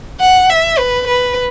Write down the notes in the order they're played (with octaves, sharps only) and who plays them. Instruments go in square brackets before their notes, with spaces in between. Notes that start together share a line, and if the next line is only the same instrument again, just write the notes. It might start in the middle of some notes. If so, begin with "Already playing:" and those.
[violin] F#5
E5
B4
B4